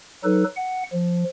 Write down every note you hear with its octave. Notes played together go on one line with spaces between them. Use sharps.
F#3 D#4 A4 B4
F#5
F3